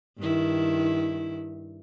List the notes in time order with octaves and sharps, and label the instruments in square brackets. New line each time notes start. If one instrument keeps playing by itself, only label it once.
[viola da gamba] G2 D#3 E4